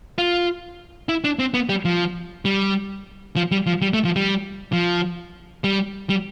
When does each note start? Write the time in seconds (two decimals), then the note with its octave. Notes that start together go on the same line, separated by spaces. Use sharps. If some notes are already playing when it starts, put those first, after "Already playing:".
0.18 F4
1.09 E4
1.24 D4
1.39 C4
1.54 B3
1.69 G3
1.85 F3
2.45 G3
3.36 F3
3.51 G3
3.67 F3
3.82 G3
3.93 A3
4.05 F3
4.16 G3
4.73 F3
5.64 G3
6.10 G3